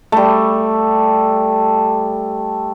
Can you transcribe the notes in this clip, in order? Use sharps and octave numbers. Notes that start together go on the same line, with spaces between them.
G3 A3